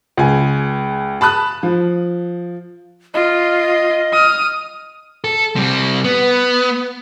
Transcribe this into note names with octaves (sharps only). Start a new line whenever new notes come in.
C#2 G#5
A5 B5 D#6 F#6
F3
F4 D#5
D#6 F6
A4
C3 G3
B3